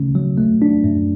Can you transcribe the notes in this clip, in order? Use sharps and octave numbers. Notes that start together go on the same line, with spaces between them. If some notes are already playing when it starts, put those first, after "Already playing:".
Already playing: C#3 A3 C#4
F#3
A3
D4
F#2